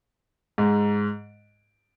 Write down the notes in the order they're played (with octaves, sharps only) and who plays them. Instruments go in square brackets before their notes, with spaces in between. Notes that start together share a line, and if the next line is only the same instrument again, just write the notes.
[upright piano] G#2